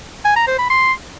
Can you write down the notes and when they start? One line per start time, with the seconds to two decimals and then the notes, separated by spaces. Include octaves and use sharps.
0.25 G#5
0.36 A#5
0.47 C5
0.59 B5
0.70 C6